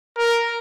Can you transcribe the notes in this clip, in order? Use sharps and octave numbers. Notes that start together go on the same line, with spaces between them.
A#4